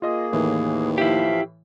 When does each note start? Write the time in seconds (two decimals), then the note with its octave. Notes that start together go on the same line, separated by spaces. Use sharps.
0.02 A#3 F4 G#4 D#5 D#6
0.33 D#2 A2 E3
0.98 F3 E4 G4 E5 F5